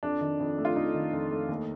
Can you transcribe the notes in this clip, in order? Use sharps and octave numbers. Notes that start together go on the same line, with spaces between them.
F2 D4
D#3
F2
A3
F4
F2 D#4
D#3
F2
A3
D#2